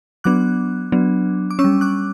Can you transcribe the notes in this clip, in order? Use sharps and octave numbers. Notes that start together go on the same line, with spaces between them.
F#3 B3 D4 D6 F#6
F#3 B3 D4
D6
C#4 C#6 E6
G3
D6 F#6